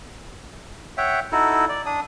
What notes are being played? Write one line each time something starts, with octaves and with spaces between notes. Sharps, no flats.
C#5 E5 F#5 G5
D#4 E4 F#4 A4
D5
D4 D#6